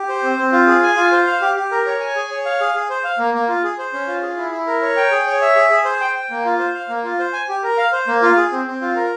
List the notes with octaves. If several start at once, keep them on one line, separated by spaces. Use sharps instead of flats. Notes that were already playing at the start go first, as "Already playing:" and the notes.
Already playing: G4
C5
C4
C4
F4
G#4
G#5
F4
C5
F5
G4
G4
A#4
C#5
G#5
G#4
C#5
F5
G#4
G#4
C5
F5
A#3
A#3
F4
G#4
C5
C#4
F4
G#4
E4
E4
A#4
C#5
G5
G#4
C#5
E5
G#4
G#4
C5
G5
G5
A#3
F4
C5
F5
A#3
F4
C5
G#5
G4
A#4
F5
C5
A#3
F4
G#4
C4
C4
F4
A#4